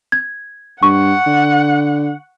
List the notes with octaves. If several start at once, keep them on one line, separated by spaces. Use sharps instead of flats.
G#6
G2 F#5 C#6
D3